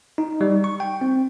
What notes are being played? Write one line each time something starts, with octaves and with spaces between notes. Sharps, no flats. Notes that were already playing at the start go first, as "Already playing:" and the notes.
D#4
G3
C#6
G5
C4